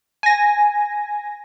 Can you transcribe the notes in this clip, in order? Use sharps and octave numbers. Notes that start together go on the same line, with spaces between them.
G#5 A#6